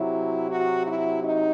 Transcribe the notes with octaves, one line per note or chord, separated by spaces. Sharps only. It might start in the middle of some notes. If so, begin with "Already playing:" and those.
Already playing: C3 F#3 E4
F#4
E4
D#4